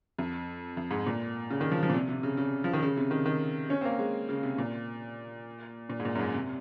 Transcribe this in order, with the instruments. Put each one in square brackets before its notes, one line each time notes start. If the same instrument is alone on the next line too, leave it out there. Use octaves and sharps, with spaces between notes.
[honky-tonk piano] F2
F2
G#2
A#2
C#3
D#3
F3
F3
A#2
C3
C3
C#3
C#3
F3
D#3
C#3
C3
D#3
D#3
C#4
C4
A#3
G#3
C#3
C3
A#2
A#2
G#2
A#2
F#2
G#2
C3